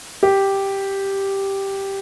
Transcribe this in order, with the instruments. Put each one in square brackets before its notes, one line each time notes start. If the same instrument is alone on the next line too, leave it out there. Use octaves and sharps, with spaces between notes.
[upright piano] G4